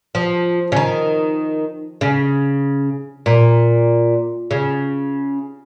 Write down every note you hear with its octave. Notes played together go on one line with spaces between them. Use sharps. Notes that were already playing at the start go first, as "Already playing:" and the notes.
F3
C#3
D#3
C#3
A#2
C#3